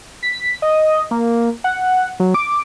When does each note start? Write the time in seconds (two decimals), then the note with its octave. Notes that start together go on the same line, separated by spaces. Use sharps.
0.23 B6
0.62 D#5
1.11 A#3
1.64 F#5
2.20 F#3
2.34 D6